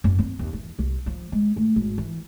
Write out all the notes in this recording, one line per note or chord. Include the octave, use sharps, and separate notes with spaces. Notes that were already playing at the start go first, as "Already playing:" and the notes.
F#2
C4
D#2
E3
C2
F3
G#3
A3
G#1
E3